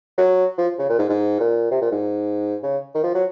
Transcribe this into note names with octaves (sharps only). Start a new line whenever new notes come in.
F#3
F3
C#3
A#2
G#2
G#2
A#2
C3
A#2
G#2
C#3
D#3
F3
F#3